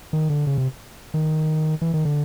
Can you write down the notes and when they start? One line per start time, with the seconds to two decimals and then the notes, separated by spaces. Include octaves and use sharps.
0.13 D#3
0.30 D3
0.47 C#3
0.58 C3
1.14 D#3
1.82 E3
1.94 D#3
2.05 D3